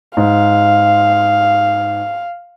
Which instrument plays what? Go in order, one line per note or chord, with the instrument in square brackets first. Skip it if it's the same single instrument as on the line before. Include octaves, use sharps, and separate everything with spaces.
[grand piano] G#2 [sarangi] F5